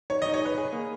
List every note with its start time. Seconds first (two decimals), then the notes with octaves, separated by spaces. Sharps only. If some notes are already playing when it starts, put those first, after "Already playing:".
0.10 D#4 C#5
0.22 D#5
0.26 D#4
0.34 C#5
0.42 G#4 B4
0.58 G#4
0.73 A#3